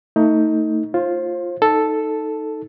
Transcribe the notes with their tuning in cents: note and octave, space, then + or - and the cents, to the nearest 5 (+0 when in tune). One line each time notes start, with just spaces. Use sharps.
A3 +30 D#4 +20
F4 +0 C5 +30
D#4 +5 A4 +0